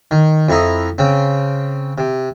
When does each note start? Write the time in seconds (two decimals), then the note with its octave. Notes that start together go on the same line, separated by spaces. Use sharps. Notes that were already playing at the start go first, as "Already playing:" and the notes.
0.11 D#3
0.49 F2 E4 A#5 D#6
0.98 C#3 C4
1.98 C3